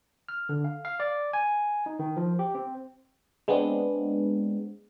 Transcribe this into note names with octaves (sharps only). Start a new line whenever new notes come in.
F6
D3
F5
F5
D5
G#5
D#4
D#3
F3
G4
C4
G#3 B3 C4 D4